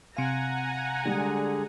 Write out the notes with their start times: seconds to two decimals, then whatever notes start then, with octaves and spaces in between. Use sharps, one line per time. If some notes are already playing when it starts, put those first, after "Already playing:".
0.17 C3 F5 F#5 G#5 A#5
1.05 D3 G3 G#3 G#4